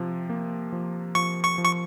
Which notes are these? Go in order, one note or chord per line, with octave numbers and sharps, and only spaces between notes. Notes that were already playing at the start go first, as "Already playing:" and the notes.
Already playing: C3 F3
A#3
F3
F3 C#6
C#6
F3
C#6